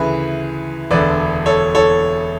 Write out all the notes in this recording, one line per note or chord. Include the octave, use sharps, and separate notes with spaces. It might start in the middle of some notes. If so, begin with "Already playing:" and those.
Already playing: D2 C#3 E3 G#4 B4
E1 D2 D3 B4 D5
A4 C#5
A4 C#5